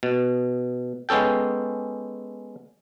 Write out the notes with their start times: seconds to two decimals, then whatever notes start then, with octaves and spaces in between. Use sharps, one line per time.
0.03 B2
1.09 G#3 B3 C#4 A4 G5